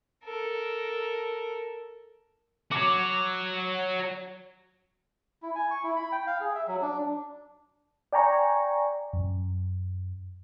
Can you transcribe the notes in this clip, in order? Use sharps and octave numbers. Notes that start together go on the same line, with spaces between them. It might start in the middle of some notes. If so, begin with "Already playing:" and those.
A4 A#4
F#4 C#5 D6
E4
G#5
C#6
E4
B5
G5
F5
G#4
E5
F#3
D4
D5 G5 G#5 A#5 C#6
F#2